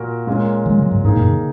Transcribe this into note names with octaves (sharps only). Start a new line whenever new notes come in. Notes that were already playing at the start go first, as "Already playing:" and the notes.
Already playing: A#2 A#3 F#4 A#4
A#2 G#3 C#4 A#4
D#3 G#3
C#3 F#3
G#2
G#2 D#3 A#3 D#4 G#4
F#2 A#2
C#3